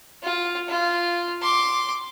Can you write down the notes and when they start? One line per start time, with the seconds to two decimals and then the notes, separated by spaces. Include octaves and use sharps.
0.23 F4
0.69 F4
1.41 C6 D6